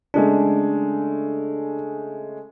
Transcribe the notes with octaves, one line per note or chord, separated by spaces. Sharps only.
C#3 G#3 A3 D4